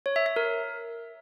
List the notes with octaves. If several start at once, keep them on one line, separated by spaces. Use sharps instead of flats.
C#5
E5
E5
A#4